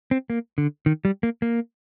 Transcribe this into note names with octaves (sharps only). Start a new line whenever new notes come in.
C4
A#3
D3
D#3
G3
A#3
A#3